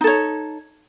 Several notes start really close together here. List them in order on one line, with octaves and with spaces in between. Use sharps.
D#4 A4 C#5